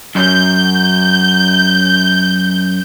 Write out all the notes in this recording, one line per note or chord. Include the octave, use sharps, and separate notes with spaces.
F#2 G6